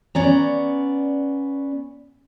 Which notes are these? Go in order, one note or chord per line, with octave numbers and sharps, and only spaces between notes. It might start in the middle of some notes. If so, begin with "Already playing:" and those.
B3 C#4 D5 A#5